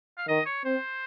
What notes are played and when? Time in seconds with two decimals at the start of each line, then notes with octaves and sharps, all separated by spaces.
0.18 F5
0.28 D#3 D#5
0.46 C#5
0.65 C4 C5